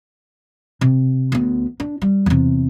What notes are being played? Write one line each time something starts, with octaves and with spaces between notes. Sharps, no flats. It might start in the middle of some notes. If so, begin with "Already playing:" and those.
C3
D2 B3
D4
G3
E2 C3